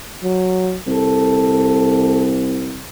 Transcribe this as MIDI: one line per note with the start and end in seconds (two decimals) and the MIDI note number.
0.23 0.77 54
0.86 2.87 36
0.86 2.29 69